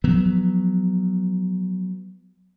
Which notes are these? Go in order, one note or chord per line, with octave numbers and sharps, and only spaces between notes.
F3 F#3 B3